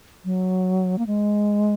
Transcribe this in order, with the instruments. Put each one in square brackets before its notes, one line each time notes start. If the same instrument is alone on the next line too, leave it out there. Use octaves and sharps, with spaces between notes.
[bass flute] F#3
A#3
G#3